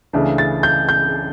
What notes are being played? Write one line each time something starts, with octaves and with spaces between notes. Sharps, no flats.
C#2 C#3 E3 A3 D4
A6
G6
G6